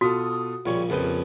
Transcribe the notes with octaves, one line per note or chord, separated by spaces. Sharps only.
B2 F4 F#4 A4 D#6
A#1 C#3 G3 F4 C#5
A#1 F2 C#3 F3 G4 B4